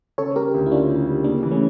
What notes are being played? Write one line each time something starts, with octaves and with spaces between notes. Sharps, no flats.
C#3 A4 C#5
G3 G4 A#4
D2
E4
C#4 D4 F4
C#3
G3
C#3 A#3 D4
E3
A3 C#4